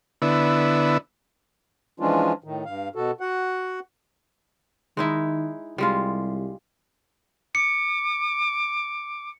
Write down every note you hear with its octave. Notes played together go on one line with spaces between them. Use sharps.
D3 B3 E4
E3 F3 G#3 C#4 D4 F4
A2 D#3
G2 F5
B2 F#4 A4
F#4 F#5
D#3 G#3 D#4 E4
C2 G3 G#3 F4
D6 C#7